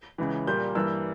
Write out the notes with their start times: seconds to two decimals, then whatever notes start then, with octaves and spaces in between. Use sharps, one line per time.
0.18 C#2 C#3 E3
0.47 A#2 G3 A#3 G6
0.75 G2 E3 A#3 E6